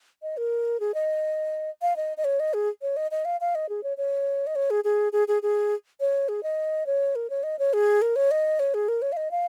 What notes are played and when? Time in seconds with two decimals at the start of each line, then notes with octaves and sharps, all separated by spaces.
0.22 D#5
0.37 A#4
0.80 G#4
0.94 D#5
1.82 F5
1.96 D#5
2.17 D#5
2.24 C#5
2.40 D#5
2.54 G#4
2.82 C#5
2.97 D#5
3.11 D#5
3.25 F5
3.41 F5
3.55 D#5
3.69 G#4
3.83 C#5
3.97 C#5
4.47 D#5
4.55 C#5
4.70 G#4
4.84 G#4
5.13 G#4
5.28 G#4
5.42 G#4
6.00 C#5
6.28 G#4
6.43 D#5
6.86 C#5
7.15 A#4
7.30 C#5
7.43 D#5
7.59 C#5
7.73 G#4
8.02 A#4
8.16 C#5
8.31 D#5
8.59 C#5
8.74 G#4
8.88 A#4
9.02 C#5
9.12 F5
9.17 D#5
9.31 F5